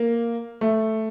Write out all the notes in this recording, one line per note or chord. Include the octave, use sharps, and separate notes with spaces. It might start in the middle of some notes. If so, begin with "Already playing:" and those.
Already playing: A#3
A3